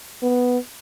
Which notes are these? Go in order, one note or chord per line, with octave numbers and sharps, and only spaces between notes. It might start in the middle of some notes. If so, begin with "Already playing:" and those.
B3